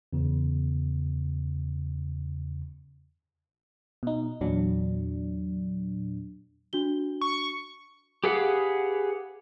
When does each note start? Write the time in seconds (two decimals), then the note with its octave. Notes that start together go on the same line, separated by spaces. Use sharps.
0.13 E2 C#3
4.03 B2 D#4
4.41 E2 A#2 F#3 D4
6.73 D4 F#4 G7
7.21 C#6
8.24 G4 G#4 B4 F5 F#5